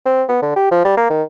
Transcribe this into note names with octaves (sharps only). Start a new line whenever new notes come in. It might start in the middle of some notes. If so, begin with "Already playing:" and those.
C4
B3
D3
G4
F3
G3
A#3
D#3